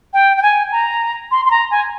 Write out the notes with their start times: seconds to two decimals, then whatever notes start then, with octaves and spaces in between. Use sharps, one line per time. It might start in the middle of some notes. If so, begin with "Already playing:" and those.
0.13 G5
0.37 G5
0.42 G#5
0.72 A#5
1.31 C6
1.45 C6
1.51 A#5
1.71 G#5